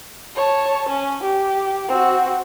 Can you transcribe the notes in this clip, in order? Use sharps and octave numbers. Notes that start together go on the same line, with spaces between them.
C#5 A5
C#4
G4
C4 F#4